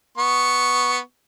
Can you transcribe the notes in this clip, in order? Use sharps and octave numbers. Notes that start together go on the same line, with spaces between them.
B3 C#6